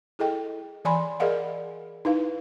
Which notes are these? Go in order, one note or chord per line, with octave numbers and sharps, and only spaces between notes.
E4 G#4 A4 D#5 G5
E3 D5 G#5 B5 C6
G#4 A#4 D5 D#5 F5 F#5
D#4 E4 B4 F5